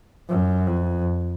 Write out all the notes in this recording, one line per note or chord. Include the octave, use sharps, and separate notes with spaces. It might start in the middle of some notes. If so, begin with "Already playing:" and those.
F#2
F2